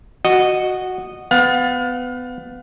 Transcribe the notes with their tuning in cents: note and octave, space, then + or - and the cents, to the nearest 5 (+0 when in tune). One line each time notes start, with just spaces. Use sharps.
F#4 +0 D#5 -15
B3 +25 F5 +35